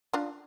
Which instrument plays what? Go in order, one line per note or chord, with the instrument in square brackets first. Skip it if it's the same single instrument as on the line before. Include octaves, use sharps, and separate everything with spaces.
[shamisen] D4 F4